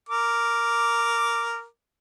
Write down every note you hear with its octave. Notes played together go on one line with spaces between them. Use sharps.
A#4 D6